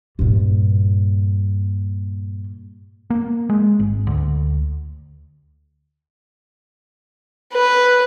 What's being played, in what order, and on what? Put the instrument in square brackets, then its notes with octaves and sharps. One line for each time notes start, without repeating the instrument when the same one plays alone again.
[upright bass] G2 A#2
[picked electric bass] A#3
G#3
G#1
D2
[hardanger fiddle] B4